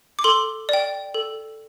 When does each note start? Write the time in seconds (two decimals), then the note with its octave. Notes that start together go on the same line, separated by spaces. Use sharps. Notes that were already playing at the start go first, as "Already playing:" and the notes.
0.19 D6
0.24 A4 C6
0.69 D5 G5
1.14 A4